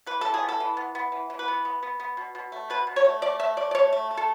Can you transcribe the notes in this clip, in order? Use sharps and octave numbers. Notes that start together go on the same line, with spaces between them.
E3 B4
E3 A4
G#4
B3
A4
E3
B3
B3
E3
E3
B4
B3
B3
B3
B3
B2
B2
A3
B2 B4
B2
C#5
A3
A3 D5
A3 E5
A3 D5
D5
A3 C#5
A3
A3
A4